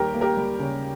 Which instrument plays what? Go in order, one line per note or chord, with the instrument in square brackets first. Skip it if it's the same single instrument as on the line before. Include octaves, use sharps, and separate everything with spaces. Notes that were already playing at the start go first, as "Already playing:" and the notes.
Already playing: [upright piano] D#2 G3 G4 A#4
A#3
G4 A#4
G3
C#3